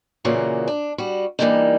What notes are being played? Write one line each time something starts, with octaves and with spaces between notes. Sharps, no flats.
A#2 C#3 E3 A#3 F#4
D4
G3 F#4
E3 G3 G#3 A#3 D4 D#4